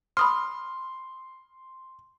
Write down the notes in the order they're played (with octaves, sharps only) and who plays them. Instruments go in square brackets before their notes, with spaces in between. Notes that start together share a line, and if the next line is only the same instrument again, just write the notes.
[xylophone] B5 D#6 F6 [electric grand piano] C6